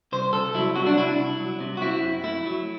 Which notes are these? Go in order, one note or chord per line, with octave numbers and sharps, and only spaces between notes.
C2 C5
C2 A4
F#3 E4
C3 F#4
D4
C2 E4
C2
F#3
C3
F#4
C4 E4
F#2
A3 E4
F#3